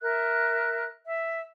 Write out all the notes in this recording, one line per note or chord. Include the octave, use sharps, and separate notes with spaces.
A#4 E5 F#6
E5